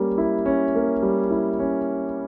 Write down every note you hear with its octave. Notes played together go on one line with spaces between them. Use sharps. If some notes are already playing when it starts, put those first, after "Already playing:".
Already playing: G3 A#3 C#4
E4
C#4
A#3
G3
E4
C#4